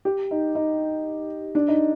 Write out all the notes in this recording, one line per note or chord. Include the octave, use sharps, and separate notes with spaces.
G4
D#4
D#4
D4
D#4